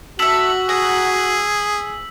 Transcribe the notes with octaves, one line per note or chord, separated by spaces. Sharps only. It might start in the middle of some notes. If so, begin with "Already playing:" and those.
F#4 A4 E5 E6 B6 F#7
G#4 A#5